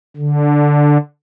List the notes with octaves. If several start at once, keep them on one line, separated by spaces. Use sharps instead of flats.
D3